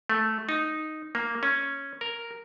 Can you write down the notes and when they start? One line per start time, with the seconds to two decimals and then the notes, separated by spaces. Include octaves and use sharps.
0.09 A3
0.49 D#4
1.15 A#3
1.43 C#4
2.01 A#4